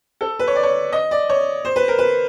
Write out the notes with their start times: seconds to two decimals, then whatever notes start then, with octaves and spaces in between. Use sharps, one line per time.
0.21 A4
0.39 B4
0.47 C#5
0.55 D5
0.63 C#5
0.93 D#5
1.11 D5
1.29 C#5
1.65 C5
1.76 B4
1.88 A#4
1.99 B4